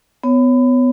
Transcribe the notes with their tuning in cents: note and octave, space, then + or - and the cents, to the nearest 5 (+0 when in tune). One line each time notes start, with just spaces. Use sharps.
B3 +25 C#5 -5